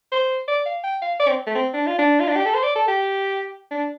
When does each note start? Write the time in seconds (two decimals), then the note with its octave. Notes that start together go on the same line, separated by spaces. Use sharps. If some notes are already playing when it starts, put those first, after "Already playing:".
0.12 C5
0.48 D5
0.66 F5
0.84 G5
1.02 F5
1.20 D5
1.28 C4
1.47 A3
1.55 C4
1.73 D4
1.87 F4
1.99 D4
2.20 F4
2.28 D4
2.36 G4
2.46 A4
2.55 C5
2.64 D5
2.76 A4
2.88 G4
3.71 D4